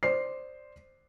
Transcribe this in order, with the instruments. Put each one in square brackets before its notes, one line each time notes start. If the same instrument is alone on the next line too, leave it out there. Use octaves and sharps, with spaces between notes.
[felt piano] C5 D5 C7